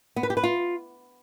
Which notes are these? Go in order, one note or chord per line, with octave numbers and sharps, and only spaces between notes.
B3
B4
G4
B4
F4